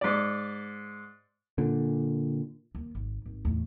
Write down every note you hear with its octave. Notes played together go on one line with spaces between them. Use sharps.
G#2 D5
A#2 D3
D#2
G#1
G#1
E2 A2